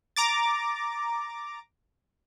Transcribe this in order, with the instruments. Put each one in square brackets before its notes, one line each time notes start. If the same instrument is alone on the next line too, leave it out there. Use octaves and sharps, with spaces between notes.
[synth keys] A#5 D6 A6